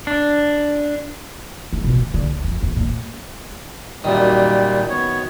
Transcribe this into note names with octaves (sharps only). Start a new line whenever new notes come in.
D4
G#3
B2
D3
D3
C#2
F2
E2
A#2
F#2 A#2 D#3 G3
B3 C#5